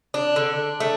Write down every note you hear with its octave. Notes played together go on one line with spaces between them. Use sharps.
D4
D3
A3